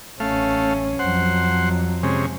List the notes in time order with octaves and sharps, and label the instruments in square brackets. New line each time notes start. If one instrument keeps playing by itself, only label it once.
[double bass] A1 C#4 [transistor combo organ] A3 F5
[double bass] F2 F#3 [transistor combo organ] C5 F#5
[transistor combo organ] C3 G#3 C#4